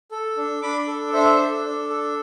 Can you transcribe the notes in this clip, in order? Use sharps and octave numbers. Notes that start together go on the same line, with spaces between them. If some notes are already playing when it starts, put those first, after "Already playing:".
A4
D4
D4 B5 D6
A4
D4 C5 E5
A4
D4
A4